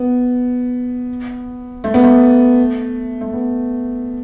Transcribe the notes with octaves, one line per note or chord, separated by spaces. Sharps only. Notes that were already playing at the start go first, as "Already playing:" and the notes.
Already playing: B3
A3
B3
A3
A3
B3